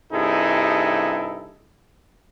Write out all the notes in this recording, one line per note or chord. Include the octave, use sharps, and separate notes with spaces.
G2 C3 D#4 E4 G#4 A4